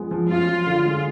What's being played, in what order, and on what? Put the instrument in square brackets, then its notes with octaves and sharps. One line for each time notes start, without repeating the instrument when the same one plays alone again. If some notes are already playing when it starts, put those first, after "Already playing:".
Already playing: [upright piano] F3 G#3 B3
F3
[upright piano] F#2 [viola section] F4
[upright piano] F3
D3
G#3